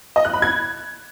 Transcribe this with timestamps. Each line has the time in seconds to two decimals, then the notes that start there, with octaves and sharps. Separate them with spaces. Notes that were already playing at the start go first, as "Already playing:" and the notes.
0.16 D#5
0.25 F#6
0.33 B5
0.42 G#6